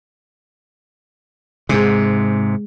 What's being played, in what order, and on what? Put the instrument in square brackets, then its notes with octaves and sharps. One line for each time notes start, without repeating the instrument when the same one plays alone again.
[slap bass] G#2 C3 [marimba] G#3 G#4